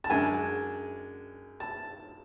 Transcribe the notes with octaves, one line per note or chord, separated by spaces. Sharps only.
A5
F#2 D3 G#3 G#5
A5